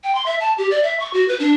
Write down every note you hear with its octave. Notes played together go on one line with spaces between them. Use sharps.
G5
C6
E5
A5
G4
D5
E5
C#6
F#4
B4
D4